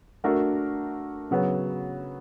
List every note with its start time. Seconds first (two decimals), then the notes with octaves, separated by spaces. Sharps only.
0.24 A3 D4 F#4 A#4
1.31 C#3 F#3 B3